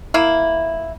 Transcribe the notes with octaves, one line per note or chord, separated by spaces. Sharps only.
A#3 E4